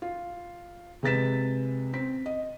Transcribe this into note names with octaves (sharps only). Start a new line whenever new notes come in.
F4
C3 G#3 B4 A6 B6 E7
C4 B6
D#5